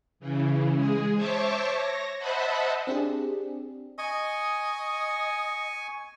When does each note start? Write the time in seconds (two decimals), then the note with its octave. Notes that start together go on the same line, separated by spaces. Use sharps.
0.20 C#3 E3
0.72 G#3 G#4
1.15 C5 C#5 E5 A5 C#6 D6
1.71 C#5 A#6
2.18 C5 D#5 E5 F#5 A5 B5
2.87 C4 D4 G4 G#4
3.98 D#5 G#5 C#6